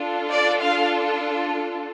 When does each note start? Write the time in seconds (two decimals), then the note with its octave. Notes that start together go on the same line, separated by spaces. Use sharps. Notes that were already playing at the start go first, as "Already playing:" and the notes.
Already playing: D4 F4 A4
0.30 D5
0.61 F5